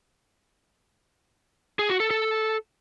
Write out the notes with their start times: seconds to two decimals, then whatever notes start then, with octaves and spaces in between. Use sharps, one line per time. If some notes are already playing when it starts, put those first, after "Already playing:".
1.79 G#4
1.90 F#4
2.00 A4
2.11 A4